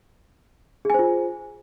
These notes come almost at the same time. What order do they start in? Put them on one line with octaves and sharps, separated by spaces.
G#4 G#5 C5 F4